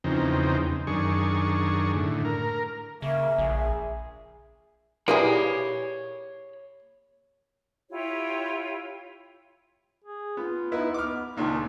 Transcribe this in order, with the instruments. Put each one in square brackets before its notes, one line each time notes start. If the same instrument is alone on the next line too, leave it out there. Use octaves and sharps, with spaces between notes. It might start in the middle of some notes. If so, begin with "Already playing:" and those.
[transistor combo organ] E2 C#3 F3 C4 D#4
F#2 D#3 D4 G#4 C#6
A2 D3
A#4
[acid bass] C#3 [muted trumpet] A#3 [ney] E5
[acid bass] A#1 [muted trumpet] G#4
[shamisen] A#3 E4 G#4 [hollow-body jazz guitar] G4 B4 D5 [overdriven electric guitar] C#5 B5
[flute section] E4 F4 G4 C#5
[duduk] G#4
[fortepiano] B3 [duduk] F4
[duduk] B3 [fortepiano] D#4 E4 B4
[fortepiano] D6 F6
[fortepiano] C#2 A#2 D#3 [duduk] D4